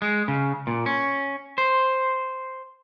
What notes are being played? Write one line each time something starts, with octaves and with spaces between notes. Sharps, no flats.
G#3
C#3
A#2
C#4
C5